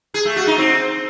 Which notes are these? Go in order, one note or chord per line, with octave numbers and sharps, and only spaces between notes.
G#4
A3
F#4
D#4
C4